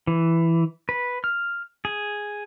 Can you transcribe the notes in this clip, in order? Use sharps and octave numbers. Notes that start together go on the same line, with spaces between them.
E3
B4
F6
G#4